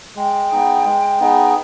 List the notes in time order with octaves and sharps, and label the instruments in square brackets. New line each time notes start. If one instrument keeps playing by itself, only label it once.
[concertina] G#3 [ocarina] G5
[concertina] B3 D#4 G#4
G#3
B3 D#4 G#4